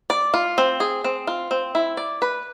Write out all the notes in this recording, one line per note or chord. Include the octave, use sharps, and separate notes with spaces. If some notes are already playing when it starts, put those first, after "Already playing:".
D5
F4
C4
G#4
C4
F4
C4
E4
D5
B4